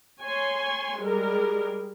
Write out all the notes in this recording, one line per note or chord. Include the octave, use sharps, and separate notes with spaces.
C#5 G#5 C6
G3 G#3 G#4 A#4